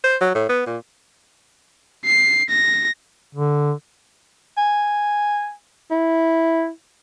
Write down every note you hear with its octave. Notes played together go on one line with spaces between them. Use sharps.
C5
F#3
A2
B3
A#2
C7
A#6
D3
G#5
E4